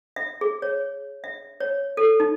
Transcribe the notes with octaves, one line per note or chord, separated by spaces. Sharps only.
E5
G#4
C#5
E5
C#5
A4
D#4